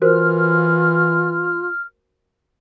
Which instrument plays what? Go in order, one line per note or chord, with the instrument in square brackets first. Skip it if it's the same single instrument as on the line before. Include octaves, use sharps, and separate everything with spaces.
[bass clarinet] E3 [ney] F4 [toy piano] F#4 A#4 C5 [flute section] F6